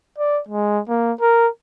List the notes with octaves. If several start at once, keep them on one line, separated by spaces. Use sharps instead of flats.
D5
G#3
A#3
A#4